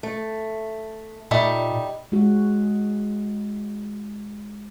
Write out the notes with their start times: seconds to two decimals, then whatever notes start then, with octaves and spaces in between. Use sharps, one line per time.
0.03 A3
1.31 A#2 G3 A3 D#4
2.12 G#3 F#4